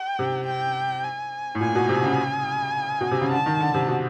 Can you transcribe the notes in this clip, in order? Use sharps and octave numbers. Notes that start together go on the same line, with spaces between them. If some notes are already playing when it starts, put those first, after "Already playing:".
Already playing: G5
C3
G5
G#5
A2
A#2 G#5
B2
C3
C#3
B2
C3
C#3
D3 A5
D#3
D3
C3
B2